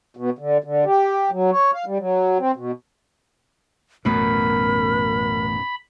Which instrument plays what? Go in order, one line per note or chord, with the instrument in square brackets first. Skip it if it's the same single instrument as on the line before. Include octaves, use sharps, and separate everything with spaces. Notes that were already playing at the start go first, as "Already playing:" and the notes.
[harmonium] B2
D3
D3
G4
F#3
C#5
F5
G3
F#3
C4
B2
[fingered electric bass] A1 A3 B3 [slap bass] F#2 B2 [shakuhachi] A#4 [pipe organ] B5